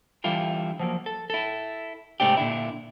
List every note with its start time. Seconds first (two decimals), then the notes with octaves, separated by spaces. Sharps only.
0.24 D3 E3 G3 E4 F4 A4
0.80 F3 F#3 A#3
1.06 A4
1.30 E4 A4
2.20 G#2 C3 A3 C4 D4 G4
2.37 A#2 D3 E4